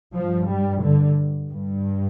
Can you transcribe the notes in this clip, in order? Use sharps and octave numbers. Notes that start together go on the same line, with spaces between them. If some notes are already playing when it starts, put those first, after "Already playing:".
G2 F3
G3
D3
G2